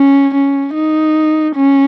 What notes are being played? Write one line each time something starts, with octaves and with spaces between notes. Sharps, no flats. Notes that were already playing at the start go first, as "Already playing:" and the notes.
Already playing: C#4
C#4
D#4
C#4